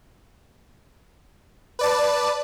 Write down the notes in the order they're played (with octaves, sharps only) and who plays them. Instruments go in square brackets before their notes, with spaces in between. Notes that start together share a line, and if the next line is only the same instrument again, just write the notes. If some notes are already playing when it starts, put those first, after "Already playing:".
[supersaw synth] B4 D5 A5